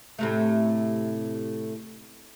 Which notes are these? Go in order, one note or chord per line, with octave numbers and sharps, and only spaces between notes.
A2 C3 A3